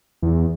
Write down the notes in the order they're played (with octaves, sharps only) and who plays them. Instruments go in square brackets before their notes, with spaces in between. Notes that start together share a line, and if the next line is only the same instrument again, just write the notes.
[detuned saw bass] E2